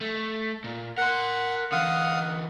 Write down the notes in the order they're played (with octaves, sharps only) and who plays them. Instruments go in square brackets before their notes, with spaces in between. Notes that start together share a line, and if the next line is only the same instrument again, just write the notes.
[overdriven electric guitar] A3
A#2
[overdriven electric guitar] A#4 C6 [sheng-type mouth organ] F#5
[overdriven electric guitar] D3 E3 [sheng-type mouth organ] F5 F#5 D#6